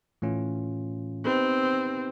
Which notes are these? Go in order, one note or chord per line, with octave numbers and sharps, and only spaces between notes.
A2 E3 A3 C#4 F4
B3 C4 D#4 G4 B4